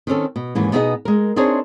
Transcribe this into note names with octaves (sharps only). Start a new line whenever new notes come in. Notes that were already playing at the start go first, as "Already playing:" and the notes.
D#3 C4 C#4 A4
B2
D#2 G#2 E3 C#4
B2 B3 D#4 F4 G#4 D#5
G#3 A#4
C4 D4 D#4 G#4 C5 C#5